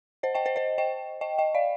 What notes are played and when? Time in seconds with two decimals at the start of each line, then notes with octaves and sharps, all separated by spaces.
0.23 C5 D#5
0.35 D#5 G5
0.46 C5 D#5
0.56 C5 D#5
0.78 D#5 G5
1.21 D#5 G5
1.38 D#5 G5
1.55 D5 F5